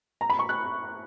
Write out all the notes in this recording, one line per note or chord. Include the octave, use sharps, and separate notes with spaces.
A#5
B5
C#6
F#6